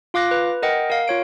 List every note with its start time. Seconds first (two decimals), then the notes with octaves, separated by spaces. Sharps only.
0.14 F4 F5 D6 F#6 A#6
0.31 B4
0.62 A#4 D#5 F#5 G5
0.90 A#4 F5
1.08 F4 C#5 D7